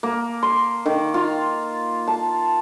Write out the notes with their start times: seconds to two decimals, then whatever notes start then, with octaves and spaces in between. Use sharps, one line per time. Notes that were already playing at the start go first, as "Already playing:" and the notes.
0.03 A#3
0.43 C6
0.86 D#3
1.14 F4
2.07 A5